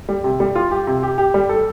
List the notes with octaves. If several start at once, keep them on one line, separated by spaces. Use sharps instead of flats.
G3
C3
G3
F4
G4
C3
G4
G4
G3
A4